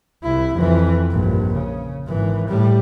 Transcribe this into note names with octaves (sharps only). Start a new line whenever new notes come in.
C2 E4
F2 E3
A#1 G2
C#3
G#1 E3
A2 G3